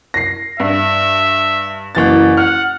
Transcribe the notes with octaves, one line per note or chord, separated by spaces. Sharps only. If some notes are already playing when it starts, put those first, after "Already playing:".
A#6 C7
G2 E5
F#1 E3 A6
F#5 F6